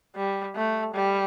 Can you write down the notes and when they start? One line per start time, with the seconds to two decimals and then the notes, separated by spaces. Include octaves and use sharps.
0.16 G3
0.56 A3
0.94 G3